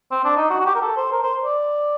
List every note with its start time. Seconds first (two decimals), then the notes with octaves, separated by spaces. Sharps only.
0.11 C4
0.24 D4
0.37 D#4
0.50 F#4
0.60 F#4
0.65 G4
0.75 A#4
0.81 A4
0.97 C5
1.12 A#4
1.23 C5
1.44 D5